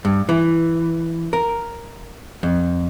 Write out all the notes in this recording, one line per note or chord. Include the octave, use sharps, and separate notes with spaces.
G2
E3
A#4
F2